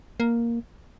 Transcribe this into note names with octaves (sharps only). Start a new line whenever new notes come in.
A#3